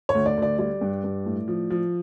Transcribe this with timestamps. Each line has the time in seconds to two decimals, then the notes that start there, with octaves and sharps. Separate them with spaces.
0.09 C#5
0.15 D2
0.26 D5
0.37 D2
0.42 D5
0.58 G3 D5
0.81 G2
1.04 G2
1.26 A2
1.48 F3
1.70 F3